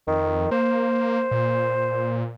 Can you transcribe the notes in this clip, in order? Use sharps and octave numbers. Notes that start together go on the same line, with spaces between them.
F2 D#3
A#3 C5
A#2